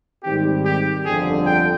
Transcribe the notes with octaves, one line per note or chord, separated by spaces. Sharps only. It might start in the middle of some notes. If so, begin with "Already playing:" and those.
G#2 D#3 G3 C4 G4
G4
G1 F2 D3 F3 G#4
G5